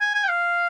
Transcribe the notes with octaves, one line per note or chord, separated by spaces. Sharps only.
G#5
G#5
G5
F5